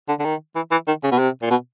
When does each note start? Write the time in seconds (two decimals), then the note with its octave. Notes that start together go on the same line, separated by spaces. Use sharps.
0.09 D3
0.19 D3
0.25 D#3
0.56 E3
0.71 E3
0.87 D#3
1.03 C#3
1.11 B2
1.19 C3
1.42 A#2
1.51 B2